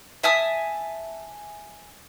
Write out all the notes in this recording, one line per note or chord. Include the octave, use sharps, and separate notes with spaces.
E5 G#5 A5 D#6